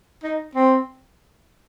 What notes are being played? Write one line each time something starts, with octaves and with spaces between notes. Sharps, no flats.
D#4
C4